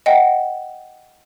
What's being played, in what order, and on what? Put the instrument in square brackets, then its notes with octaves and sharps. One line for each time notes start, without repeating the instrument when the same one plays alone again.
[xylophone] D#5 F#5 G5